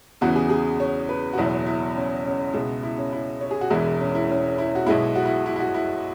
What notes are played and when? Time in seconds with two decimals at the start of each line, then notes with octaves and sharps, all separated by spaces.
0.21 E2 C#3 E3 B3 F#4
0.36 G#4
0.50 G#4
0.80 C#5
1.09 B4
1.33 F#4
1.37 F#1 E2 B2 F#3 B3 E4
1.67 E4
1.96 C#4
2.26 C#4
2.54 C#2 B2 G#3 B3 E4
2.83 E4
2.97 C#4
3.12 E4
3.41 C#5
3.51 G#4
3.61 F#4
3.70 E1 E2 E3 G#3 E4
4.00 C#4
4.15 E4
4.29 C#4
4.58 E4
4.75 F#4
4.86 B1 B2 G#3 B3 E4
5.16 F#4
5.25 E4
5.46 E4
5.56 E4
5.60 F#4
5.74 E4